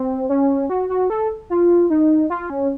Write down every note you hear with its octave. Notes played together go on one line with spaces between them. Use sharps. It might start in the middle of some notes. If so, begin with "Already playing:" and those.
Already playing: C4
C#4
F#4
F#4
A4
F4
D#4
F4
C#4